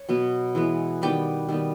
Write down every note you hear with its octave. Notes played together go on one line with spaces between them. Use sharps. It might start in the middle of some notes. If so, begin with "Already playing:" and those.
Already playing: C#5
B2 F#3 B3
E3 G#3 B3
D#3 G3 B3 G4
D#3 G3 B3